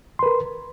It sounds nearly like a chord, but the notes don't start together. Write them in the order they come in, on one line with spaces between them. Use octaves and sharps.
C6 B4 A#4